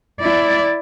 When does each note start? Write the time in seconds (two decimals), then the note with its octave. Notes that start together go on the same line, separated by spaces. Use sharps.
0.20 E4 D5